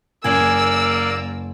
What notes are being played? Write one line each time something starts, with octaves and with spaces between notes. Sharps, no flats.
F#1 A#3 B3 G#4 D5 G#5 E6 F#7